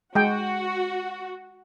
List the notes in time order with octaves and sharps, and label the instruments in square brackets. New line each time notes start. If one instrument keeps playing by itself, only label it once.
[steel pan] G#3 G5 [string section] F#4